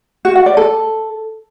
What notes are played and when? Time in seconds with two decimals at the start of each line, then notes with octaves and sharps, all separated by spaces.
0.25 F#4
0.35 F#5
0.46 D5
0.57 A4